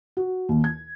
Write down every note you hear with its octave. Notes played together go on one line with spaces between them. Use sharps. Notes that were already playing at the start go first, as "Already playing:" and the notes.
F#4
D#2
G#6